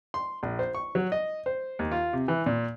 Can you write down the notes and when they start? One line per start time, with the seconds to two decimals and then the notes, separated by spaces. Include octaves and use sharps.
0.14 C6
0.43 A#1
0.59 C5
0.75 C#6
0.95 F#3
1.12 D#5
1.46 C5
1.79 D#2
1.91 F4
2.13 C3
2.28 E3
2.46 A#2